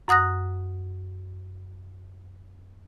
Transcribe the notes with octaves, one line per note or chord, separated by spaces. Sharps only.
F#2 F#5 D#6 F#6 A#6